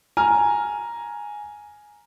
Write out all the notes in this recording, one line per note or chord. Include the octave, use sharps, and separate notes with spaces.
G#5 A#5 F6